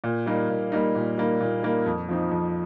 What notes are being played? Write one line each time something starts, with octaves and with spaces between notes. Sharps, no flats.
A#2
G3 A#3 D#4
A#2
G3 A#3 D#4
A#2
G3 A#3 D#4
A#2
G3 A#3 D#4
F2
F3 C4 D#4
F2